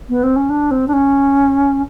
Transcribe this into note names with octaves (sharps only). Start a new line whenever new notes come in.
B3
C4
C#4
D4
C4
D4
C#4